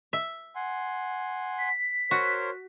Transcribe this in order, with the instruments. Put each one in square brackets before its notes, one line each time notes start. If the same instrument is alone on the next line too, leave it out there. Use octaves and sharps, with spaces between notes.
[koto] E5
[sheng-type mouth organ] F#5 G#5 C6
[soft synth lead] B6
[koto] F#4 [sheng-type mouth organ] A#4 C5 C#5